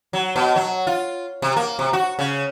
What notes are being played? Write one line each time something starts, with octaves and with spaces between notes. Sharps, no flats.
F#3
B2
F#3
F4
C3
A#3
C3
F#4
C#3